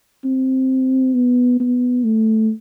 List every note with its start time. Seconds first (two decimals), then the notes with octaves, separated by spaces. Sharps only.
0.25 C4
1.14 B3
1.60 B3
2.04 A3